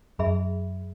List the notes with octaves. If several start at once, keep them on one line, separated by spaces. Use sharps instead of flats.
F#2 G#4 E5 B5